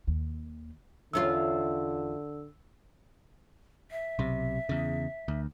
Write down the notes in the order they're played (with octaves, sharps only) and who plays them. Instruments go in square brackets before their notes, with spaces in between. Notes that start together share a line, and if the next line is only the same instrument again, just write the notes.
[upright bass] D#2
[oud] E2 C#4 F4 [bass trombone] D3 [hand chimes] E6
[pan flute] E5
[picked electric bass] B1 C3
E2 C#3
D2